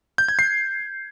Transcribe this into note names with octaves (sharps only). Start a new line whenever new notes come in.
G6
G#6
C7